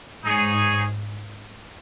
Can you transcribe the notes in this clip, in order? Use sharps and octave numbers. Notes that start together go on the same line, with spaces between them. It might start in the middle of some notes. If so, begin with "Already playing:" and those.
G#2 D#4 G#4 C#5